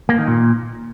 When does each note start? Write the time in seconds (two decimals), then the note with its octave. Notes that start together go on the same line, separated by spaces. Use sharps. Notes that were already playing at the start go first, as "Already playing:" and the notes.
0.09 A#3
0.18 D#3
0.27 A#2